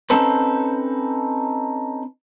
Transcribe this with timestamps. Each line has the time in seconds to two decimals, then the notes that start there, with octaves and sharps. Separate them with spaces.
0.10 C4 C#4 D#4 A4 B4 C5